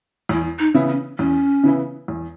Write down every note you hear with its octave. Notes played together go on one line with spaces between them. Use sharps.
E2 E4
D#4
C#3 E3 B3 E4
C#4
E2 C#4
C#3 E3 B3 E4
E2